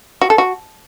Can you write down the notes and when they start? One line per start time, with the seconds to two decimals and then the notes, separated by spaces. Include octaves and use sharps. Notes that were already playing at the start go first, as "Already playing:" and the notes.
0.21 F#4
0.30 A4
0.38 F#4